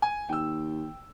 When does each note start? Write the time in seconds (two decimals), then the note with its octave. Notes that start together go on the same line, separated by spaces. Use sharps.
0.02 G#5
0.29 D#2 G5 E6